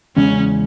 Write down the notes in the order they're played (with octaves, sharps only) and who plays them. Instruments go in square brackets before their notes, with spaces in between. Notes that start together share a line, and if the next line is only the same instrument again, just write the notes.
[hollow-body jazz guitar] E2 C#3 G#3 [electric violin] C#4